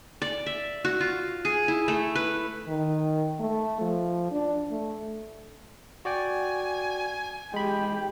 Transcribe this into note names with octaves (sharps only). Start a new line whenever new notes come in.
D5
E5
F#4
F4
G#4
E4
A3
B4
D#3
A3
F3
D4
A3
F#4 D5 G5 G#5
G#3 G4 G5 B5